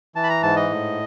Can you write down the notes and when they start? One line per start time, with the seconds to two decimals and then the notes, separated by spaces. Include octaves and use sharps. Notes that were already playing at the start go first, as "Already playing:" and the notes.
0.15 E3 A5
0.23 B5
0.29 A#5
0.43 G#2 A5
0.56 D#5
0.70 A2